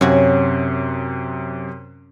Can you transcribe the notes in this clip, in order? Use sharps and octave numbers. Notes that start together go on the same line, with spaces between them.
F#2 C3 C#4 F#4